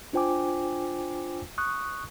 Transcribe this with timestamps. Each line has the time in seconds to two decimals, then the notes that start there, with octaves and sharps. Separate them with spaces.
0.13 D4 F4 C5 G5 G#5 D6
1.58 C#6 D#6 F#6